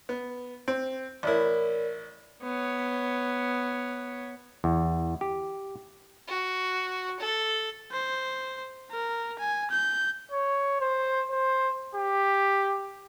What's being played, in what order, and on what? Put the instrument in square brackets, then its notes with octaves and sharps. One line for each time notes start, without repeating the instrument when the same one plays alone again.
[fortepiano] B3
C4
[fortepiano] A1 E4 [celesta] A#4 C#5 D5
[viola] B3 C#5
[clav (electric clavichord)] E2
G4
[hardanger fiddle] F#4
A4
[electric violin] C5
A#4
G#5
G6
[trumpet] C#5
C5
C5
G4